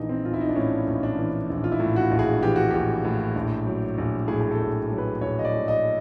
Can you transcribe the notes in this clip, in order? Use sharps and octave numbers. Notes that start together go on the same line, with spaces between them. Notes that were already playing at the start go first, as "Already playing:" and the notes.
Already playing: A#1 E3 D#4
C4
A#1 F4
E4
D#4
D4
A2 C#4
A#1
D4
E3
A#1
F4
E4
A2
F#4
A#1
G#4
E3 G4
F#4
A#1 G4
A2
A#1
F#3
A#1
A2 G#4
G#4
A4
A#1
F#3
B4
A#1 C#5
D#5
D5
A2
D#5